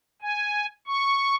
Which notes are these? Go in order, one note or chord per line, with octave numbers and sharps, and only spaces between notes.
G#5
C#6